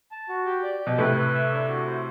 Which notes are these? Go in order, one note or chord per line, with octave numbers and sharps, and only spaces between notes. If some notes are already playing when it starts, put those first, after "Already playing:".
A5
F#4
G4
D5
G4
B2
A2 C3 B4
B4
E5
D4
F#4
C5